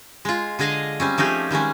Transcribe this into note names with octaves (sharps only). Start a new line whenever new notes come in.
G#3 F4
D3 G#3 G#4 D#5 F5
G3 C4 C#4
F3 A3 D#4 G4 G#4
D#3 G3 G#3 C#4